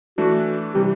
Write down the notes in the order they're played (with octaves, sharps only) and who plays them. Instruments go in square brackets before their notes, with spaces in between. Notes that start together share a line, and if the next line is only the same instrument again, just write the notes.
[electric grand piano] E3 A3 D4 [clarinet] F#4
[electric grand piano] C3 E3 G3 [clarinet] G4